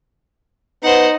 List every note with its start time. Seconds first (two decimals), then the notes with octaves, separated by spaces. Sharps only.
0.83 B3 D#4 C5 F#5